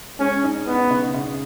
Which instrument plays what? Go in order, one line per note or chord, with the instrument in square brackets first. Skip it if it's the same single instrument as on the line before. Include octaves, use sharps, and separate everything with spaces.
[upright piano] G#3 [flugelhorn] C#4
[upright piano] D#4
[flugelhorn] B3 [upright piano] D#4
[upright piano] C#3
C#3